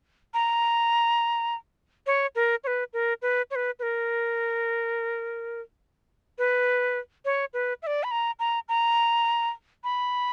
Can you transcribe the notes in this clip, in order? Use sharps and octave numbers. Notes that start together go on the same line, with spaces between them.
A#5
C#5
A#4
C#5
B4
A#4
B4
C#5
B4
B4
A#4
B4
C#5
B4
E5
D5
B5
A#5
A#5
A#5
B5